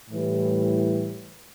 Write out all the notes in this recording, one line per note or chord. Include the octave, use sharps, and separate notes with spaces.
A2 E3 G3